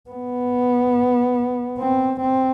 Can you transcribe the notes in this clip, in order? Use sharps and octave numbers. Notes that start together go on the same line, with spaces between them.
B3
C4
C4